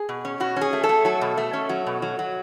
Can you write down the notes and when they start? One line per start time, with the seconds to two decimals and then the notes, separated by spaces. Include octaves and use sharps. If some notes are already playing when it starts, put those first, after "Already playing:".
Already playing: G#4
0.09 B2
0.25 C#4
0.40 B2 F#4
0.56 C#4
0.61 G#4
0.73 A3
0.84 A4
0.89 A3
1.05 F#3 A4
1.21 B2
1.37 A3
1.53 C#4
1.69 F#3
1.87 B2
2.02 F#3
2.19 F#3